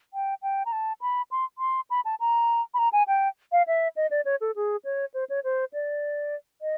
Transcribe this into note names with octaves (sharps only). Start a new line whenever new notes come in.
G5
G5
A#5
A5
B5
C6
C6
B5
A5
A#5
B5
A#5
G#5
G5
F5
E5
D#5
D5
C#5
A4
G#4
C#5
C5
C#5
C5
D5
D#5